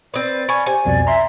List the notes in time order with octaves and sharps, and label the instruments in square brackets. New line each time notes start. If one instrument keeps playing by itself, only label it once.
[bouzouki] C4 B4 [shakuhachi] D5
[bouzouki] C#4 [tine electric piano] G#5 B5
[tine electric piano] G4 C5 [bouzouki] G#5
[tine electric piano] C2 F2 B2 [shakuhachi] D5
[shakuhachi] E5 [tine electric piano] A#5 C6